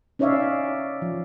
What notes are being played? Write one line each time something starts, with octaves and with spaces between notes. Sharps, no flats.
C#4 D#4 C#5 D5 E5 F5
F3